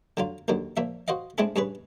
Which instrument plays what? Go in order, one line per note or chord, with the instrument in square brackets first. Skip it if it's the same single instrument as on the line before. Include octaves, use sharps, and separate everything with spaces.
[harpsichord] D3 F#3 F4
D#2 D3 D#3 F#3
A#2 F3 E5
F#4 C5 D#5 F5
G#3 C4 D4 E4 G#4 A4
G2 C#4 G#4 B4